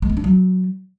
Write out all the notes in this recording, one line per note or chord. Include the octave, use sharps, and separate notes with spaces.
G#3
B3
D4
F#3